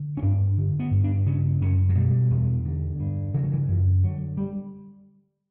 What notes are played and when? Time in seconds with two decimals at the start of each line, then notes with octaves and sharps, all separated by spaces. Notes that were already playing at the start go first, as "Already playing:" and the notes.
Already playing: D3
0.17 C#4
0.22 G2 D4
0.58 D3
0.80 B3
0.91 G2
1.04 D4
1.26 C#3 C#4
1.61 F#2 C#4
1.89 F#3
1.95 B2 G3
2.31 E2
2.65 D3
3.00 G2
3.34 C#3 E3
3.43 F#3
3.52 E3
3.69 F#2 E3
4.04 D3 F#3
4.37 G3